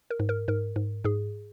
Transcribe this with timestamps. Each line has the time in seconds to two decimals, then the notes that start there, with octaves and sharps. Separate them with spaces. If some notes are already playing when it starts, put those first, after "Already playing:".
0.10 A#4
0.20 G#2
0.29 A#4
0.48 G#2 A#4
0.76 G#2
1.04 G#2 G#4